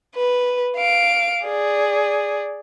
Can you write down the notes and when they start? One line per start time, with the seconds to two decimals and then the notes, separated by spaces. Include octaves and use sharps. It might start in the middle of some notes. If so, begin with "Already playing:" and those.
0.16 B4
0.77 F5 D7
1.45 G#4 D5